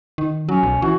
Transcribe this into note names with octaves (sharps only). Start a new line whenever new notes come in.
D#3
F#3 C#4
B1
E3 F#4